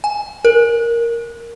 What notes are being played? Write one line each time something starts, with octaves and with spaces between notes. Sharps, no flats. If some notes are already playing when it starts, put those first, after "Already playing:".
G#5
A#4